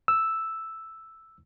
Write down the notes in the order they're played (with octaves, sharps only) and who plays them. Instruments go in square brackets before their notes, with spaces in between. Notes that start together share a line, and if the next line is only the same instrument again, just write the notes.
[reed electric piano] E6